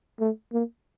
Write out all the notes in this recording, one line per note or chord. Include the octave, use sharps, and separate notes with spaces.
A3
A#3